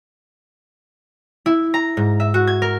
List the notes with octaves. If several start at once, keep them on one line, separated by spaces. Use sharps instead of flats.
E4
A#5
G#2
E5
F#4
G#6
A#4